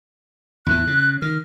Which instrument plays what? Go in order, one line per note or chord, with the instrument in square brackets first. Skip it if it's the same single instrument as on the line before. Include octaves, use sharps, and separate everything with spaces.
[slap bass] E2 A2 E3 [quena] F#6
[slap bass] C#3
[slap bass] D#3 [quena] F6